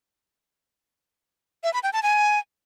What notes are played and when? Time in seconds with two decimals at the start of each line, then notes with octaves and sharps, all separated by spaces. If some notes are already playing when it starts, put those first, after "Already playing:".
1.64 E5
1.73 B5
1.83 G5
1.93 A5
2.03 G#5